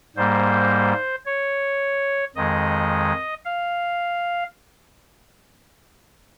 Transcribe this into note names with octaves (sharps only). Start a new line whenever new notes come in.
G#2 G3 A#3 C5
C#5
F2 D#3 G#3 D#5
F5